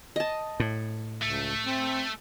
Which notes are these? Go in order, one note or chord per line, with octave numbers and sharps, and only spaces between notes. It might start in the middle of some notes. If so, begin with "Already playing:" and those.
D#5 A5
A2
C#2 A3
C4